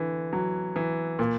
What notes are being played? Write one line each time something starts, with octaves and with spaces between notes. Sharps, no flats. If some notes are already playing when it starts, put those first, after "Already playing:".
Already playing: D3 E3
F#3
E3
A#2